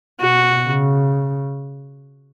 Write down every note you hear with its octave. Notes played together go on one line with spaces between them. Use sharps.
B2 F#4
C#3